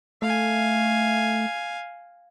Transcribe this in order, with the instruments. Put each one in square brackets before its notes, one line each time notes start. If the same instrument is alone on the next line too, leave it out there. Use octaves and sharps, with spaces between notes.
[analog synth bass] A3 [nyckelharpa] F5 G#5